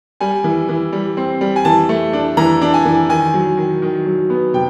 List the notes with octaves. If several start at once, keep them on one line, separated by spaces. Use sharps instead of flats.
G3 G#5
E3
E3
G3
C4
G3
G#5
E3 A5
A3
D4
E3 A#5
D4
G#5
E3
D#3 G#5
F#3
D#3
D#3
F#3
B3
C3 G5